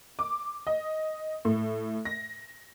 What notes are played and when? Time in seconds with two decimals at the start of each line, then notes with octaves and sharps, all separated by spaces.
0.19 D6
0.67 D#5
1.45 A2
2.05 A#6